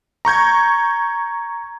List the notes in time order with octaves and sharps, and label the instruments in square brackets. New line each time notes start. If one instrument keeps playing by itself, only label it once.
[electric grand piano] A#5 C#6 G6 G#6